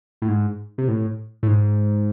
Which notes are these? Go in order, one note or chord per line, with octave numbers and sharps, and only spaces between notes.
A2
G#2
C3
A2
A2
G#2